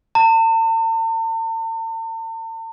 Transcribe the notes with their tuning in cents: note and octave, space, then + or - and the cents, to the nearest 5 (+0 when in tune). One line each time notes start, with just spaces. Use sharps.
A5 +45